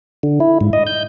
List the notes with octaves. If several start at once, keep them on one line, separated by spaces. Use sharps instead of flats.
D3
E4
G#2
D#5
G6